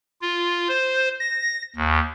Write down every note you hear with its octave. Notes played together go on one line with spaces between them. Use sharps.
F4
C5
A#6
D#2